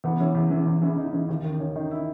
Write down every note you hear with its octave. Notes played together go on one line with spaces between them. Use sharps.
E2 B3
C#3 E3 C#4
E2
E3
C#3
E2
C#3 E3
E2 D#4
C#3 E3
D#2
D#3
D#2 C#4
D#3 D#4
E4